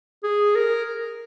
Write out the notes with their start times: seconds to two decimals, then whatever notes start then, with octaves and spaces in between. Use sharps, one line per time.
0.24 G#4
0.56 A#4